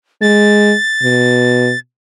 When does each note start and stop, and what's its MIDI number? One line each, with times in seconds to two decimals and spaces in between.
0.22 0.74 56
0.22 1.79 93
1.03 1.72 47